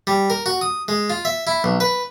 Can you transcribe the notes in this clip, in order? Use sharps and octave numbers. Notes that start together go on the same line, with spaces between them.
G3
A#4
F#4
D#6
G#3
F4
E5
E4
B1
B4